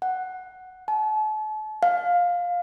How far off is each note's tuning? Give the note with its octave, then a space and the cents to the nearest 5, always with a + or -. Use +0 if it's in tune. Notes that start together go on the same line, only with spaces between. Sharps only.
F#5 +5
A5 -40
F5 +15